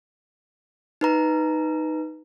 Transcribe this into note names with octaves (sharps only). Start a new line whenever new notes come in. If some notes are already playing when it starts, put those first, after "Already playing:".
D#4 B4 A#5